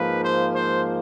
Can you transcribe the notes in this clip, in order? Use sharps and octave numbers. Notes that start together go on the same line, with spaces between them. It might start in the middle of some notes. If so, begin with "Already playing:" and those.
Already playing: G#2 F3 A#3 B4
C5
C5